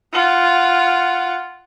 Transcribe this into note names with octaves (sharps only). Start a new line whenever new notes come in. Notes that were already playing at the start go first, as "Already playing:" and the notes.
F4 F#5